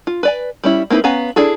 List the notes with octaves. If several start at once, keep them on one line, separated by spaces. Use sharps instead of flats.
F4
B4 D5 G#5
G3 C#4 E4
A#3 C4 D#4 E4 B4
B3 C#4 F5 G#5 A#5
D4 E4 G#4 A4